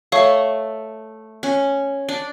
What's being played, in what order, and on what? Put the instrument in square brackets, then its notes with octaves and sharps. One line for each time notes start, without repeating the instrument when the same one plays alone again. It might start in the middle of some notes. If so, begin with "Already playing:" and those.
[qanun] A3 [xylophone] C#5 F5 C#6
[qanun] C#4
D4